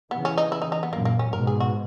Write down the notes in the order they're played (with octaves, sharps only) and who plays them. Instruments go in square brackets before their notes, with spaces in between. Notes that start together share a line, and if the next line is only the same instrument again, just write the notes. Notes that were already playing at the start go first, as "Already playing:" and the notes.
[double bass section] C#3 E3 [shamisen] B3
[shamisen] C#4
D#4
E4
D#4
D#4
B3
[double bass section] F#2 A#2 [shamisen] A#3
[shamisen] A#3
C#4
[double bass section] G#2 B2 [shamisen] A#4
[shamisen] G#4
F#4